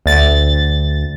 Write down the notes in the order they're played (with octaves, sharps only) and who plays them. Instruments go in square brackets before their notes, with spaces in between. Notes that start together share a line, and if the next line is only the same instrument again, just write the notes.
[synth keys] D2 A6